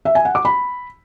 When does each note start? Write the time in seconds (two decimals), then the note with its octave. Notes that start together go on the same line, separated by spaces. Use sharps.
0.05 E5
0.15 G#5
0.25 F#5
0.35 D6
0.45 B5